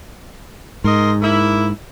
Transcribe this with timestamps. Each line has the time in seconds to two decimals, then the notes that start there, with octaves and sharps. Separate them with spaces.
0.84 G#2 A#4 D#5 C6
1.21 A#3 E4